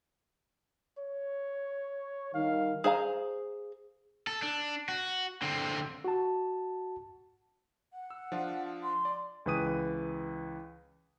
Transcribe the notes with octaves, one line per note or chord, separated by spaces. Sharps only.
C#5
D#3 G3 F5
G#4 C5 F5 A#5
A4
D4
F#4
D3 C4
F#4 A5
F#5
E6
F3 D4 F4
C6
D5
C#2 E3 B4 D#6 D#7